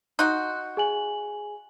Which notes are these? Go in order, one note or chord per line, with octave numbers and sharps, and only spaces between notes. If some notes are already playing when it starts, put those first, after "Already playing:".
D#4 F#4 C6 F#6 G6
G#4 G#5 F#7